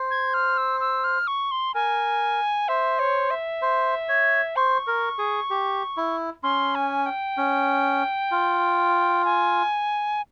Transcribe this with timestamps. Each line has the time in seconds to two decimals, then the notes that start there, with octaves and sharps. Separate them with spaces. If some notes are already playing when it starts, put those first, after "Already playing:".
Already playing: C5
0.11 G#6
0.34 F6
0.58 E6
0.80 E6
1.04 F6
1.27 C#6
1.51 C6
1.74 A#4 G#5
2.68 C5 E5
2.99 C#5
3.30 E5
3.62 C5
4.09 C#5
4.56 C5 C#6
4.87 A#4
5.18 G#4
5.50 G4
5.97 E4
6.43 C#4 C6
6.75 G#5
7.06 G5
7.37 C#4
8.31 F4
9.25 G#5